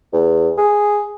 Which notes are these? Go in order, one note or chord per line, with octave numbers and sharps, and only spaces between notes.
E2
G#4